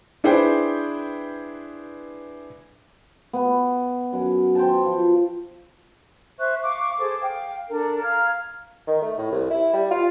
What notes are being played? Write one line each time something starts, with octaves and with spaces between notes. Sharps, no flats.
D4 E4 G#4 B4 C5 G5
B3
F#2
C5 G5 A5
F3
C5 E5 C#6 F#6
F5 C#6 D6
G#4 A4 C5 D6
F5 G5
D4 A4 A#4
F5 A#5 F6 G#6
D#3
A3
A2
C2
E4
G3
F4